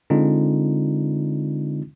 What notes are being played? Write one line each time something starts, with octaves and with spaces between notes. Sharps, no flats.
D3 G#3 C4 D4 D#4 F4